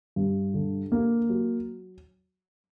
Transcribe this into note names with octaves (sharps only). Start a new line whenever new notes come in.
G2
D3
A#3
F#3